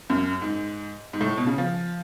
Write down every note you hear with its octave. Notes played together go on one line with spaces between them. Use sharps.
F#2
G#2
G#2
A2
B2
C#3
F3